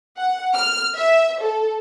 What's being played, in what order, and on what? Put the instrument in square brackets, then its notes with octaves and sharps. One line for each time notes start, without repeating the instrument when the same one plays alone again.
[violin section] F#5
F6
E5
A4